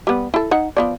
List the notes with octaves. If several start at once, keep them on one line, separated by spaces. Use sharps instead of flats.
G3 B3
E4 A4
D#4 F#5
F3 B3 D5